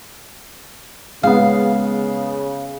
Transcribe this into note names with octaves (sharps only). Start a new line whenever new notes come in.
C#3 G#3 B3 F5